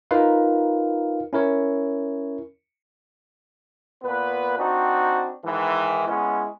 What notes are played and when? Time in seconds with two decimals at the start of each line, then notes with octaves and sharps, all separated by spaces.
0.11 D#4 F4 A#4 B4 F5
1.33 C#4 E4 A#4 C#5
4.04 A#2 B3 B4
4.58 C4 D4 D#4 F#4
5.45 G#2 D#3 E3
6.08 G#3 B3 C#4 E4